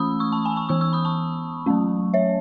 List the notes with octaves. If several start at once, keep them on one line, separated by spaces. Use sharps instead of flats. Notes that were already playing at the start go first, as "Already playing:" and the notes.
Already playing: E3 A3 C#4 B5 D#6 E6
C#6 E6
A5 C#6
G#5 B5
A5 C#6
E3 B3 C#6 E6
C#6 E6
B5 D#6
A5 C#6
F#3 A3 C#4
C#5 E5